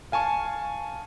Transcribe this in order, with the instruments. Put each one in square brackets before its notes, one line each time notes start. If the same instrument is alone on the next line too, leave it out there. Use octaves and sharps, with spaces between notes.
[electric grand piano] F5 G#5 A5 C#6